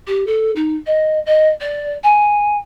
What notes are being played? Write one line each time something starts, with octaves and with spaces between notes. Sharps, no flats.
G4
A4
D#4
D#5
D#5
D5
G#5